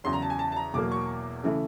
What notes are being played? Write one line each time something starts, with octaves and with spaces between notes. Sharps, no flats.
E2 C#3 F#3 C6
A#5
A5
G#5
A5
A5
A#5
E2 B2 F#3 A#3 D6
C#6
C#3 E3 A3